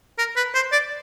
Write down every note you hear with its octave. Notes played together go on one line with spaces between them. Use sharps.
A#4
B4
C5
D5